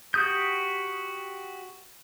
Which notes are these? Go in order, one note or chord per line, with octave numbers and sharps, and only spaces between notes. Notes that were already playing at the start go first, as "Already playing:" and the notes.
F#4 G4 D#6 G6